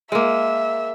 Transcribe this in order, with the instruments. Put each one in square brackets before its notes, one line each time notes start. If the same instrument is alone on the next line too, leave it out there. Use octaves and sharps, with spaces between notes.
[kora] G#3 A#3 [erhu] E5